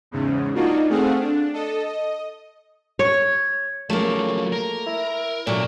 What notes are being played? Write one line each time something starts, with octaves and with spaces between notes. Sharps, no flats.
E2 G#2 C#3
A#3 D4 D#4 F4 F#4
A3 C4 G#4 F5 F#5
D4
A4 D#5
D#5
C#5
C#3 F3 F#3 A3 A#3
A#4
E4
A#2 D3 F#3 A4 D5